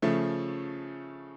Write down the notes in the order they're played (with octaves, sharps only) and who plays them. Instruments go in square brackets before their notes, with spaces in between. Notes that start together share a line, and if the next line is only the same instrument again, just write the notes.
[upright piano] C#3 F3 A3